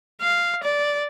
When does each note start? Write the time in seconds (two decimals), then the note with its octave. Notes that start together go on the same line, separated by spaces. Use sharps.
0.21 F5
0.64 D5